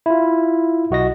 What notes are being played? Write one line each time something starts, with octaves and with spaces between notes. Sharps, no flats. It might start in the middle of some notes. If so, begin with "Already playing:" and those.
E4 F4
B1 F#4 D#5 A#6